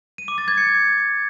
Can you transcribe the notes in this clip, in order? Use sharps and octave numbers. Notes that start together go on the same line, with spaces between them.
D#7
D6
A6
G#6
C#7